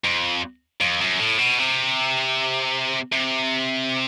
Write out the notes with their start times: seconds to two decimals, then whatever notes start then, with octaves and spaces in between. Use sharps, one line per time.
0.04 F2
0.81 F2
1.00 F#2
1.20 A2
1.38 B2
1.59 C3
3.13 C3